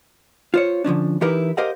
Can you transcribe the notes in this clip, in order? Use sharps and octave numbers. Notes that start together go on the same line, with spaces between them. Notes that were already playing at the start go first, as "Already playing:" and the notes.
F4 C5 C#5
D3 F3 C#4 D4
E3 D#4 E4 G4 A#4 B4
G4 A#4 C5 D#5 F5 F#5